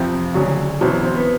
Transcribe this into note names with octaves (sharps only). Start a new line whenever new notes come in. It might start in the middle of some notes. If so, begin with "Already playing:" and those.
Already playing: F2 C3 F3 C4
D2 C#3 F#3
E2 B2 F#3 C4
C4
B3